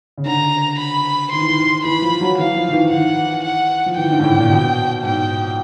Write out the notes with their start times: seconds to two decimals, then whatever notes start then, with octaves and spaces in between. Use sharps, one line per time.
0.17 C#3
0.25 D3 A#5
0.79 B5
1.32 D#3 C6
1.41 E3
1.50 D#3
1.84 E3 B5
2.02 F3
2.21 F#3
2.38 E3 F5
2.56 F3
2.68 D#3
2.73 E3
2.91 D#3 F#5
3.44 F#5
3.86 F3
3.97 E3 G5
4.04 D#3
4.11 D3
4.19 G#2
4.24 A2
4.37 A#2
4.50 B2
5.03 G#2 G5